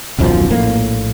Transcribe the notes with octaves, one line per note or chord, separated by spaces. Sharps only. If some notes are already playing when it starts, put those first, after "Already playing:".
D#1 B1 F#2 F3
A#1 A2 A#3